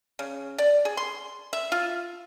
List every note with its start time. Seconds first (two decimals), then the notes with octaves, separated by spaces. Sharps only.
0.19 C#3
0.58 D5
0.85 G#4
0.97 C6
1.53 E5
1.72 F4